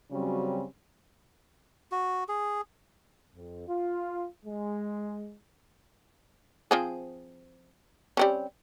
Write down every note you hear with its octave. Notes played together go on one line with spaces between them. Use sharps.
C#3 F#3 G3 C4 C#4 F#4
F#4
G#4
F2
F4
G#3
F3 C4 G#4
G3 C4 C#4